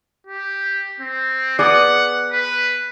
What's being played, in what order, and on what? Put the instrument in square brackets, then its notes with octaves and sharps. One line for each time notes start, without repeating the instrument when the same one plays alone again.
[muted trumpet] G4
C4
[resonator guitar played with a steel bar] B3 G#4 D5 [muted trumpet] F#5
[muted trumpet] B4